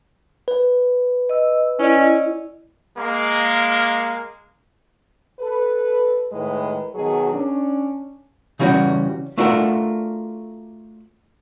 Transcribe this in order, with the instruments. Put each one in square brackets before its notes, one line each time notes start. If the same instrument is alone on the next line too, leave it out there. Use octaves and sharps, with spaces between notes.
[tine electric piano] B4
[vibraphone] D#5 E6
[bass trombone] C#4 [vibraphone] E4 D5 D#5
[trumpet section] G#3 A#3
[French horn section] A4 B4
A2 D#3 G#3 B4
B2 D#3 F#3 G#4
C#4 D4
[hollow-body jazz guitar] C#3 E3 G3 C#4 F#4
A3 D4 F4 F#4 A4 A#4